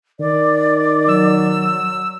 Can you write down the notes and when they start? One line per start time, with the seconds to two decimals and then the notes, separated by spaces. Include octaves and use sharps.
0.20 D#3 D5
1.08 F#3 E6